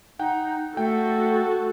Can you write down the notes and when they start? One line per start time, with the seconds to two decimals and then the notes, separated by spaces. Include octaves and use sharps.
0.19 D#4 F#5 G5
0.77 A3 F#4 A4 G5